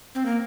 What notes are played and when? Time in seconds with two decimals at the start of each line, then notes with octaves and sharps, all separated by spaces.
0.15 C4
0.26 A#3